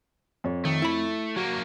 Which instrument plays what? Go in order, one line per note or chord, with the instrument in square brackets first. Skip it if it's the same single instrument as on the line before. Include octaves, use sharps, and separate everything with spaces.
[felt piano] F2 C#5
[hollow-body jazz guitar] D#3 [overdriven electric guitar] A3
[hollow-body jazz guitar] E4 B5
[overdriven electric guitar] F#3 A#3 [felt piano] F#4